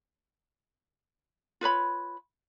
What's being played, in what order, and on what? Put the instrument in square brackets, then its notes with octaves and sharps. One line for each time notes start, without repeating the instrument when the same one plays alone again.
[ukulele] F4 B4 C#5 B5